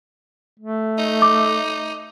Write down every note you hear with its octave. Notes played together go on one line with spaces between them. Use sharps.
A3
D#4
D6